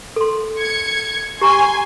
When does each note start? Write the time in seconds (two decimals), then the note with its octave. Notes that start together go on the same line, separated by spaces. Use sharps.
0.16 A4 C6
0.61 G#6 C#7
1.41 G4 G#5 A#5 C6 C#6